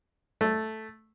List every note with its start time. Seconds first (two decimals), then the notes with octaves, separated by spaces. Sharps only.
0.41 A3